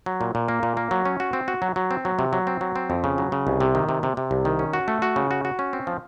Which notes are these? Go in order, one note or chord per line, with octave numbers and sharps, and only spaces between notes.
F#3
A#2
A#2
A#3
A#2
A#3
F#3
C#4
F#4
C4
F#4
F#3
F#3
C4
F#3
C3
F#3
C4
F#3
C4
F2
C#3
F#3
C#3
C2
C3
D#3
C3
C3
C3
C2
D#3
C#4
F#4
A3
F#4
C#3
F#4
F#4
C#4
C4
F3